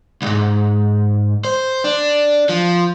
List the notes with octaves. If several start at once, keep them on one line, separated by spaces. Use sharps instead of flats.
C2 G#2
C5
D4
F3